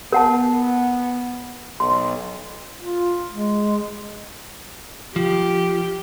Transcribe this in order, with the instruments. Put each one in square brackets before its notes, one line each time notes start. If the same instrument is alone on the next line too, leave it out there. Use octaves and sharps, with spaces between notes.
[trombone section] B3 [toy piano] A#4 F#5 A5
[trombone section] B1 [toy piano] C6
[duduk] F4
G#3
[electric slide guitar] F3 [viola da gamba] G4